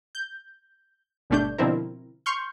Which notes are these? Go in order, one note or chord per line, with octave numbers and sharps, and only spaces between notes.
G6
G#1 B2 G3 A3 D4 G6
B2 D3 F3 C4 E4 A#4
C6 C#6 F6 G6